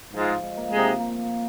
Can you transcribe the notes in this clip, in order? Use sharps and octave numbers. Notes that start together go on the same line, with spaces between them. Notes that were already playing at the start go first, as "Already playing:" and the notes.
G#2 F3 G#3 F4
G#3
A#3
C3 G#3 C4 D#4
A#3